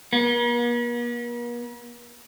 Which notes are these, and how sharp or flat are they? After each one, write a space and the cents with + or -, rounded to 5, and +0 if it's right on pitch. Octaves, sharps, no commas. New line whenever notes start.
A#3 +45